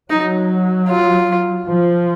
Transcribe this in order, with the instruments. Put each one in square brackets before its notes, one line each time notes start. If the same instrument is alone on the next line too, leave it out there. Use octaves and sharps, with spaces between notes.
[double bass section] F#3 [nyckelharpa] D#4
[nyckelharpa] F4
[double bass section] F3